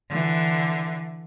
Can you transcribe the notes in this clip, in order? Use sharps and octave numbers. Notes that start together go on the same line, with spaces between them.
D3 E3